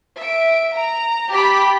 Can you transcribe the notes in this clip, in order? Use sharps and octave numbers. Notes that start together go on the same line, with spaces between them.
E5 D7
A#5
G4 G5 A5 B5 D6 B6